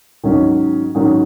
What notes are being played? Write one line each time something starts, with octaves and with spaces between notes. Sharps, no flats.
G#2 D#3 F#3 C#4
G#2 D#3 F#3 C#4